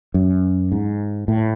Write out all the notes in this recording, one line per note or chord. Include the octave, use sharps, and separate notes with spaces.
F#2
G#2
A2